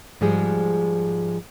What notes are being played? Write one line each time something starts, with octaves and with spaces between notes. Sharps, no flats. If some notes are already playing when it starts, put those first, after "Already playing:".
G#2 F3 G3 G#3 G#4